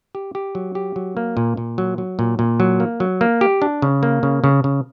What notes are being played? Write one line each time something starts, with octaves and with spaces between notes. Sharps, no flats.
G4
G4
F#3
G4
F#3
A#3
A#2
A#2
F#3
F#3
A#2
A#2
F#3
A#3
F#3
A#3
G4
D4
C#3
A#3
C#3
C#3
C#3